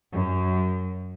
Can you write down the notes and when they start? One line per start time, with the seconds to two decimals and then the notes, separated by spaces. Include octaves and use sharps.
0.12 F#2